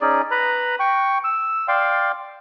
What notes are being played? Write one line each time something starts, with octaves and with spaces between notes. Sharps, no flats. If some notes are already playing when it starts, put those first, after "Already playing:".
C#4 D#4 G#4 D5
B4 A#5 B5
G5 C#6
E6
D5 F5 G5 C6